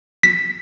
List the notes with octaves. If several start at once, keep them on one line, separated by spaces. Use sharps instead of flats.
B6